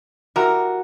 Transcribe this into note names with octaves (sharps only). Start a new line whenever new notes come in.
E4 F#4 G4 A#4